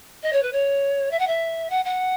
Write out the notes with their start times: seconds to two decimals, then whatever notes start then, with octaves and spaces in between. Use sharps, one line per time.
0.23 D#5
0.33 C#5
0.43 B4
0.53 C#5
1.11 E5
1.19 F#5
1.27 E5
1.70 F#5
1.85 F#5